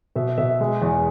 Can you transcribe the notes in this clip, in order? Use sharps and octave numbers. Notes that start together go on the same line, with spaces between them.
B2 E5
B2 E5
G#3
E2